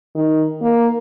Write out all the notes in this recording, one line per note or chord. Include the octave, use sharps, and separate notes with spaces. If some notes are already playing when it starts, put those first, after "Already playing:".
D#3
A#3